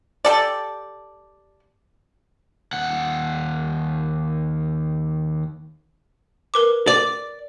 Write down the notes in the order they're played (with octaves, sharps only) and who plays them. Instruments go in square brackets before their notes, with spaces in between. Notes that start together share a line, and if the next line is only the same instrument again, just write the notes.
[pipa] G4 A4 D5
[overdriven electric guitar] D#2 F#5
[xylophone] A#4 B4 D6
[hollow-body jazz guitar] D5